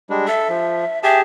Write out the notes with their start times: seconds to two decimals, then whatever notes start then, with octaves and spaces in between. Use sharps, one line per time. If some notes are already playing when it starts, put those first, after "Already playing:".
0.10 G3 G#3 D4
0.27 A4 E5
0.49 F3
1.03 G4 G#4 E5 A5